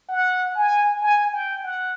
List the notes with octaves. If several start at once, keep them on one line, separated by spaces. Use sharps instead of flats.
F#5
G#5
G#5
G5
F#5